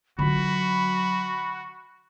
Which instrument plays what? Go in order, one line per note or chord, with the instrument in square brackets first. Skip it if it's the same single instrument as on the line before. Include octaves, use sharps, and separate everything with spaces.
[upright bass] D3 F4 [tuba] F#3 [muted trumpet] F#4 [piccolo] B5